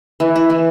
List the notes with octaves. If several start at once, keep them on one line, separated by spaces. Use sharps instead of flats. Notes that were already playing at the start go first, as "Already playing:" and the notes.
E3
E4
E3